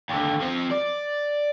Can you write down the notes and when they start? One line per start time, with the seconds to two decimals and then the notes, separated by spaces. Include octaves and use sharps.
0.09 D#2 D3
0.40 F3 C4
0.71 D5